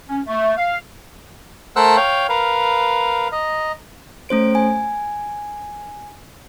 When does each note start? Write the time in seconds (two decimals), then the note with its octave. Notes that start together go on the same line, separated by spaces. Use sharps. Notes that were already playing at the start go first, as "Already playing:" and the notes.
0.08 C#4
0.26 A3
0.57 F5
1.76 A3 A#4 C5 F#5 E6 F#6
1.97 C#5 F5 G5
2.29 A#4 B4 F5
3.32 D#5 A#5
4.29 A3 C#4 C5 D7
4.55 G#5